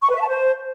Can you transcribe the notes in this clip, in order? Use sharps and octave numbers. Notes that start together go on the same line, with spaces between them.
C#6
B4
E5
A5
C5